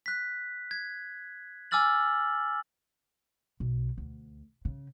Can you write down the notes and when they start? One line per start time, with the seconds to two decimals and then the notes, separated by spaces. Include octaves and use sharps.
0.06 F#6 B6
0.71 G#6
1.71 G#5 D6 E6 F6 A6 F#7
3.60 B1
3.98 D2
4.65 C#3